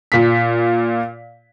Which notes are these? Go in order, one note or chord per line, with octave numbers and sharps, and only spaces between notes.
A#2 B6